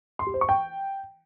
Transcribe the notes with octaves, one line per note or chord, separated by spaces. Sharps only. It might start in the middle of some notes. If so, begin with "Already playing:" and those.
C6
G4
C5
C#6
G5